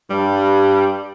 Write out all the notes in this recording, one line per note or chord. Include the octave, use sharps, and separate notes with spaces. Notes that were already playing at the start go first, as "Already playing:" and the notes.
G2 G3